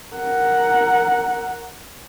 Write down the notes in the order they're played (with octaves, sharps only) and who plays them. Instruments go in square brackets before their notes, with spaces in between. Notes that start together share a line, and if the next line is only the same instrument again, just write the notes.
[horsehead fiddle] A#4 F#5